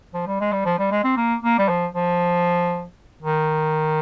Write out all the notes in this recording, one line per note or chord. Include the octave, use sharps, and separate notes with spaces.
F3
G3
G#3
G3
F3
G3
G#3
C4
A#3
A#3
G3
F3
F3
D#3